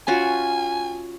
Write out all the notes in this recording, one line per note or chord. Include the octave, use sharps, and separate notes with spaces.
C#4 F4 F#4 G#5